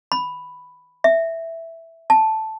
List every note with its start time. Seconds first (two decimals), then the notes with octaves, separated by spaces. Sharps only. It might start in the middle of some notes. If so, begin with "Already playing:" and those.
0.12 B5
1.04 E5
2.10 A5